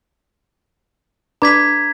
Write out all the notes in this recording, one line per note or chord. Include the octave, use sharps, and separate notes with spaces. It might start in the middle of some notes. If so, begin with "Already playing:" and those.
D4 B4 A#5 B5 D6 G#6 B6